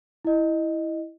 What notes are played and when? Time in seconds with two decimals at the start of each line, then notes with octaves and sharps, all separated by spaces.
0.25 E4 D#5